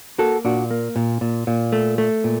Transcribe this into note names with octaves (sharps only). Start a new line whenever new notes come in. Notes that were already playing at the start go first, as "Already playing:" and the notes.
A#3 F#4 A4
A#2 D4 F#4
A#3
A#2
A#2
A#2
A3
A3
A#2